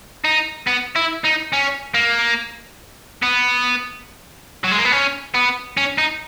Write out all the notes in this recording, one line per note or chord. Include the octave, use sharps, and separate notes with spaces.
D#4
B3
E4
D#4
C#4
A#3
B3
F#3
G#3
A#3
B3
C#4
B3
C#4
D#4